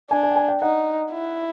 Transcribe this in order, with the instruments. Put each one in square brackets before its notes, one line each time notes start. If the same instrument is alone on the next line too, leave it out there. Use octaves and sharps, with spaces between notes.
[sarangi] D4 [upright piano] G#5
[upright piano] G#5
G5
G#5
G5
[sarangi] D#4 [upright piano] F#5
[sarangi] E4